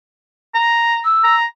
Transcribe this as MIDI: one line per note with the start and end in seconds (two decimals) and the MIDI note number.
0.54 1.01 82
1.04 1.35 88
1.24 1.45 82